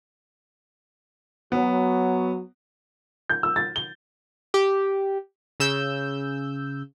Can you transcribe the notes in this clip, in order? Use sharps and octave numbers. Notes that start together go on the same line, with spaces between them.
F#3 B3
G6
E6
A6
G7
G4
C#3 E6 G6